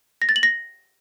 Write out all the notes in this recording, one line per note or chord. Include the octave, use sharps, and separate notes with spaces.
A#6
A6
F#7
A#6